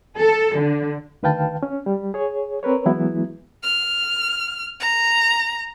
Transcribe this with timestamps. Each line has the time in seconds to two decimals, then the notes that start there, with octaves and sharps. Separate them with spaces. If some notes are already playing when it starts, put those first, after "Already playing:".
0.18 A4
0.57 D3
1.23 D2 D#3 B4 F5 G5 A5
1.63 C#4
1.86 G3
2.14 G#4 C#5
2.63 C4 A#4 B4 C#5
2.86 E3 F#3 G#3 B3 E4
3.63 F6
4.80 A#5